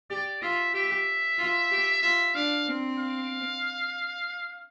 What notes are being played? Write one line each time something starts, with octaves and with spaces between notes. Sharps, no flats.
G4 D5
F4 E5
G4 E5
F4
G4
F4 E5
D4 F5
C4
F5